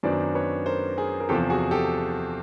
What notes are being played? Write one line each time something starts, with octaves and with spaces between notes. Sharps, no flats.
F#2 D#3 F#3 B3 D4 C5 D5
B4 C#5
A#4 C5
G#4 A#4
A#4
E2 C3 F3 G4 A4
F#4 G#4
G4 A4